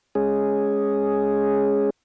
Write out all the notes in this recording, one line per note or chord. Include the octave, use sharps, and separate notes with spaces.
G#3 C#4 G#4